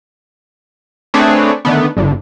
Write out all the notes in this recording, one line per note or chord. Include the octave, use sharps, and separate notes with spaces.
A3 C4 D4 G#4 B4 C#5
D3 D#3 A3 B3
G1 D3